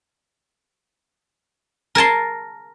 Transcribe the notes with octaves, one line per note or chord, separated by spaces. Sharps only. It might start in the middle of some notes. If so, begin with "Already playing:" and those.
A#4 G#5 A5 C6